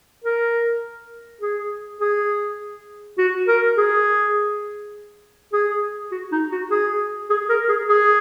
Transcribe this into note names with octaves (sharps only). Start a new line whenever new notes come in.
A#4
G#4
G#4
F#4
A#4
G#4
G#4
F#4
D#4
F#4
G#4
G#4
A#4
G#4
G#4